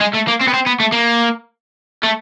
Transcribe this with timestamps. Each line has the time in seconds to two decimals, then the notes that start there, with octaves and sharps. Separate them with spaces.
0.01 G#3
0.14 A3
0.28 A#3
0.41 C4
0.48 B3
0.54 C4
0.66 B3
0.80 A3
0.92 A#3
2.03 A3